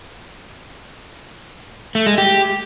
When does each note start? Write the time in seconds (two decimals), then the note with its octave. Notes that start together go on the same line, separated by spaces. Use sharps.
1.95 A3
2.06 G#3
2.18 G4